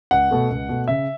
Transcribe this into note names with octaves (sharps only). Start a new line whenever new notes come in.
C#2 F#5
B2 A3
C#2
B2 A3
C#3 E5